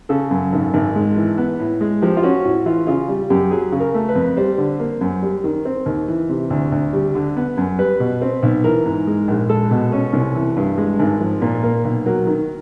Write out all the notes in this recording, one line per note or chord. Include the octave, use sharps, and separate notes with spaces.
C#3 A4
F#2
G#1
G#1
G#3
E3
B3
A2
G#3
F3 G4
F4
C#4 F#4
A2 F#4
E3 F4
C#3 F4
G3
F#2 G4
F#3 G#4
C#3
A#4
A3
B4
F2
G3 C5
D3
A#3
F#2
G3
D#3
C4
D#2
E3
C3
D2
D2
G3
D3
B3
F#2
G3 B4
B2
C4
B1
E3 A#4
G#2
G#3
A#1
G#3 A4
B2
C#4
C2
E3
G2
G#3
G#1
F3
A#2
A#3
B1
F#3 A#4
D#3